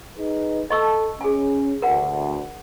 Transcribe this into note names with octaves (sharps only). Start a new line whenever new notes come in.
D#4 G#4 B4
A4 D#5 A5 C#6 E6
C#4 G#4 G#5
D2 A#4 F#5